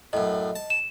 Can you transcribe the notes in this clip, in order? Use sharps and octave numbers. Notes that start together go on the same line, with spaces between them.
F#2 A2 D#5
A5
E7